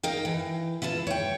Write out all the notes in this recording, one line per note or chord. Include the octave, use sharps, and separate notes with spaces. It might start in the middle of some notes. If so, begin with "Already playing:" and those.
D#4 A#4 F5 G5
E3
E4 F4 B4 A5
C#5 G5